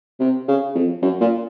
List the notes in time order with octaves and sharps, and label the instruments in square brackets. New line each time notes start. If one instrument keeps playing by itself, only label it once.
[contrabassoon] C3
C#3
F2
F#2
A#2